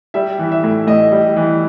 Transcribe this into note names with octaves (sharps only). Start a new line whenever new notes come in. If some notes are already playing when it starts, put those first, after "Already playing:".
G3 E5
E3
E5
A2
A2 D#5
G3
E3